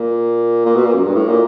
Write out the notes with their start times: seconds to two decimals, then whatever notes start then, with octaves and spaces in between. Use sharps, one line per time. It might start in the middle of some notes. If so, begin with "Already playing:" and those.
Already playing: A#2
0.66 A#2
0.75 B2
0.85 A#2
0.94 F#2
1.03 G2
1.15 A2
1.29 A#2